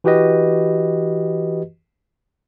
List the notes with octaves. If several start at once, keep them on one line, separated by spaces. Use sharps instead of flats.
E3 F#4 G4 B4 D#5